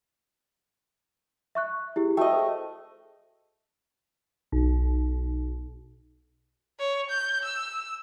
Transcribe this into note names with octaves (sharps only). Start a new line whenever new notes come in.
E5 C#6 F#6
E4 G4 G#4
A3 F#4 D#5 G5
G#4 C5
B1
C#5
G6
E6